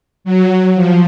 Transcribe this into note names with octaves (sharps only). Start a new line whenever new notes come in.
F#3
F3